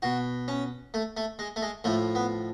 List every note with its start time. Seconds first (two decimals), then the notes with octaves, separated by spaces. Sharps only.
0.02 B2 F#4
0.48 C#4
0.94 A3
1.17 A3
1.39 G#3
1.56 A3
1.62 G#3
1.84 A2 F3 A3
2.15 B3